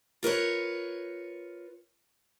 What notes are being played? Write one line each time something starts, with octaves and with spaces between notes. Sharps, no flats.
F4 A#4 B4 C#5